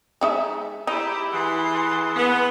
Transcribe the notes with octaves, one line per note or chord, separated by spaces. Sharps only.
G#3 D#4 E5
D#4 E4 G4
E3 G#4 F#5 C6
B3